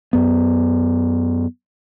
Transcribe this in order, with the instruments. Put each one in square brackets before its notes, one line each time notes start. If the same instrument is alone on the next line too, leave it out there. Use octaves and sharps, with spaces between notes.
[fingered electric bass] F#2 B3